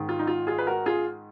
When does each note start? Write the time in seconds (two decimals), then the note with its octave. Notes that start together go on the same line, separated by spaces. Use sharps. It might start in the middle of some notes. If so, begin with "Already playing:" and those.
Already playing: G#2 D#3
0.09 F4
0.19 D#4
0.27 F4
0.47 F4 G#4
0.58 B4
0.67 F#4 A#4
0.86 F4 G#4